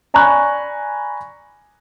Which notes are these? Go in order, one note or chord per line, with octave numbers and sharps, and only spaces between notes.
D5 G#5 A#5 B5 C#6 F#6